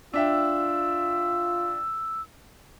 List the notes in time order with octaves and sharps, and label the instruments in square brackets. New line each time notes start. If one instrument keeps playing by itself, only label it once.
[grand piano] D4 E5 G5 [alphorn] F4 [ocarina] E6